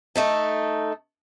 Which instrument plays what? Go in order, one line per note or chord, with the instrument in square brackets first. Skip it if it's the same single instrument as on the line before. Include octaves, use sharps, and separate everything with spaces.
[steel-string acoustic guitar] A3 D#4 A4